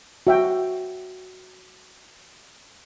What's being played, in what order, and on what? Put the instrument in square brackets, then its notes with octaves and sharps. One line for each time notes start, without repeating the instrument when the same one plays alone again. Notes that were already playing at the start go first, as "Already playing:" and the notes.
[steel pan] F#4 E5 G5